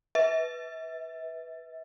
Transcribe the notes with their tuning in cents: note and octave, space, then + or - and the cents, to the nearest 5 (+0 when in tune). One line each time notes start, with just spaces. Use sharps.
B4 +0 E5 -35